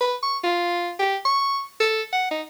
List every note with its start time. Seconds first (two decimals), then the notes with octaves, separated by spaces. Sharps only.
0.01 B4
0.23 C#6
0.44 F4
0.99 G4
1.25 C#6
1.80 A4
2.13 F#5
2.31 D#4